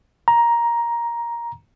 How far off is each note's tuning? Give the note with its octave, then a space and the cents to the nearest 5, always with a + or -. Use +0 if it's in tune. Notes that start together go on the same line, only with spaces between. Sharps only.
A#5 +10